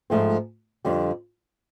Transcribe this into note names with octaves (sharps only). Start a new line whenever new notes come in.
G#2 F3 A3 C4
F2 D3 G3